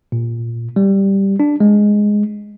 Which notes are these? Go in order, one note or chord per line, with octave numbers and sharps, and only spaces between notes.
A#2
G3
D4
G#3